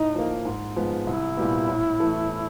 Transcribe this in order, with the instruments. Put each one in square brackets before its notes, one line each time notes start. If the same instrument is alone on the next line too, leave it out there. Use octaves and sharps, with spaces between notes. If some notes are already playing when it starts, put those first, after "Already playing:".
Already playing: [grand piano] A2 [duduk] D#4
[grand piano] F3 A#3
G#2
F3 G#3 B3
[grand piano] C2 [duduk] E4
[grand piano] A#2 G3 B3
A2
E3 A3